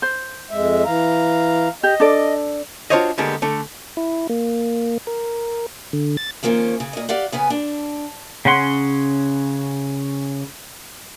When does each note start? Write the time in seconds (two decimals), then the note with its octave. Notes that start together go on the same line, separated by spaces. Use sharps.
0.02 C5
0.51 F2 G#3 E5
0.85 E3 F5 A#5
1.83 G4 D#5
2.00 D4 A4 D5
2.90 D4 F4 F#4 C5 C#5 D#5
3.18 D3 G3 G#3 A#3 B3
3.42 D3 A3
3.97 E4
4.29 A#3
5.07 A#4
5.93 D3
6.17 A6
6.43 D#3 F3 A#3 C4 C#4
6.80 C#3
6.93 A#2 D#5
7.09 G4 D5 F5 F#5
7.32 C#3 B3 B4 G#5
7.50 D4
8.45 C#3 C#4 F#5 C6